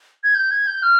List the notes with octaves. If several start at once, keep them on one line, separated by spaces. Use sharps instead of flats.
G#6
G6
G#6
G6
F6